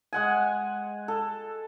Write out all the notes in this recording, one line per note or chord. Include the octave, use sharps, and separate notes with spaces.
G#3 F#5 G#5
A4